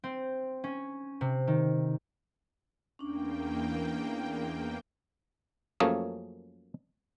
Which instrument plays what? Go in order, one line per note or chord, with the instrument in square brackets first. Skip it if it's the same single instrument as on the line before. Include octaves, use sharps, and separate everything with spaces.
[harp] C4
C#4
C3
D#3
[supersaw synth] E2 A#3 G5 [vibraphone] C#4 D4
[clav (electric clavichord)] F#2 F3 A3 A#3 C#4 G#4